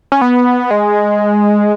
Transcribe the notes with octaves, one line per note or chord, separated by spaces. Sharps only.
C#4
B3
G#3